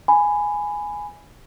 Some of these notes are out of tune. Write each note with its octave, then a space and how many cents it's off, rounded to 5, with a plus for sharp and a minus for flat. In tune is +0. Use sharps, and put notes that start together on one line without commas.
G#5 +0 B5 +15